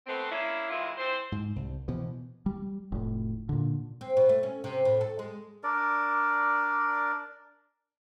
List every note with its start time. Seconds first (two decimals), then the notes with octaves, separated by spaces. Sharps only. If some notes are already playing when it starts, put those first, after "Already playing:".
0.07 A3 B3 C4
0.31 A#3 C#4 D4 E4
0.70 D#3 E3 G#3 E4 F4
0.98 E3 C4 C5
1.32 G#2
1.56 C2
1.88 B2 E3 F3
2.46 G3
2.92 F1 A2
3.49 A#2 D3
4.01 C4
4.17 B2
4.29 A3
4.43 C#4
4.64 C3
4.85 A2
5.01 A4
5.19 G#3
5.64 D4 A#4 D5